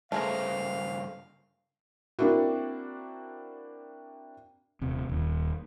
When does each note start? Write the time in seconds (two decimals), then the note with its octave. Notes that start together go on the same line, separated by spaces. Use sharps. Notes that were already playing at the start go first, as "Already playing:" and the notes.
0.12 G2 C#3 A3 G#4 A#4 C5 F5
2.19 A#3 C4 D4 E4 F#4
4.81 D#1 C3
5.09 D#1 D#2